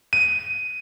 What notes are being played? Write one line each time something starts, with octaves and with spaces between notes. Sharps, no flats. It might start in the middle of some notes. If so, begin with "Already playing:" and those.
D#7